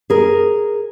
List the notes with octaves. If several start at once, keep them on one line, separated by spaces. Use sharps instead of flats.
G#4 A#4